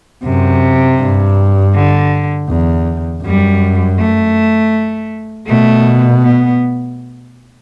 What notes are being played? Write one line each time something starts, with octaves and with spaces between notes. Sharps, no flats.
F#2 C3
G2
D3
E2
F#2 G3
A3
B2 A3
B3